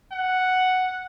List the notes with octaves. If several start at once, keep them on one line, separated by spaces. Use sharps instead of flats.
F#5